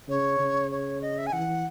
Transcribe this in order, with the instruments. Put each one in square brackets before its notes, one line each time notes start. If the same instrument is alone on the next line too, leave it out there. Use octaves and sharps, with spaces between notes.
[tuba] C#3 [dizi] C#5
[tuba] C#3
[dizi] C#5
D#5
E5
G#5
[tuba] E3 [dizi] F#5